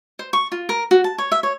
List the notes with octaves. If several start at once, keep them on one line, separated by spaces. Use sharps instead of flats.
C5
C#6
F4
A#4
F#4
A5
C#5
E5
C#5